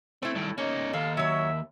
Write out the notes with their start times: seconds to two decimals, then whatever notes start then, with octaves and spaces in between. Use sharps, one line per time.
0.22 A3 C4 E4
0.35 G2 D#3
0.58 A#3 C#4 D#4 C#5
0.93 D#2 A4 F5
1.17 F#3 C#5 E5